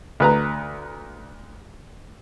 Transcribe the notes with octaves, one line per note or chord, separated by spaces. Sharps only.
D2 B4 A#5